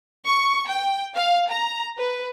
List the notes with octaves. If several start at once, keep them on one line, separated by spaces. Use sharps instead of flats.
C#6
G5
F5
A#5
B4